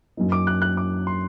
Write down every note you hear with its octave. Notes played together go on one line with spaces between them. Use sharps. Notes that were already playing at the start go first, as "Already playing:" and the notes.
F#2 F#3 A#3 D#4
D6
F#6
F#6
D6
C6